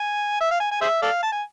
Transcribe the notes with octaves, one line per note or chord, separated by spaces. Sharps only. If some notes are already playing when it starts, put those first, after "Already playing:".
Already playing: G#5
E5
F5
G#5
G#5
G#4 C5 E5
A4 D5 F5
A5
G#5